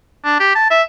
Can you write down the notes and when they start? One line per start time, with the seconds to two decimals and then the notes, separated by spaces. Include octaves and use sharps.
0.24 D4
0.40 G4
0.55 A5
0.70 E5